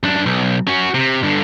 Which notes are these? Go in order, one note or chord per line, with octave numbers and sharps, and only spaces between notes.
F#2 D4
B1
C#4 F#4
C3
G2 D3